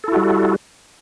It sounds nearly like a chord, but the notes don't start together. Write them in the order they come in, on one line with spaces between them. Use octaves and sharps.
A4 E4 F#4 G3